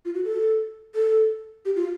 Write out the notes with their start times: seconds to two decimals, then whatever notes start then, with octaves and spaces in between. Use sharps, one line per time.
0.05 F4
0.15 F#4
0.25 A4
0.95 A4
1.65 G4
1.76 F4